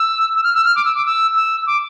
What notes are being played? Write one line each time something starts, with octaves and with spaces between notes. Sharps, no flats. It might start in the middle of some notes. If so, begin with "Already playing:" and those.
Already playing: E6
E6
F6
E6
F6
D6
E6
D6
E6
E6
D6